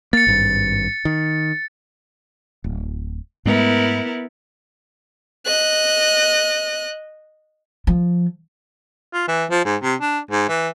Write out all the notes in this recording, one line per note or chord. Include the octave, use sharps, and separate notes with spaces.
A#3 A6 C#7
G#1 G2
D#3
D1
G#2 G#3 A3 B3 E4 A#4
D#5 F#6
F3
F4
E3
F3
G#2
C3
D4
G#2
E3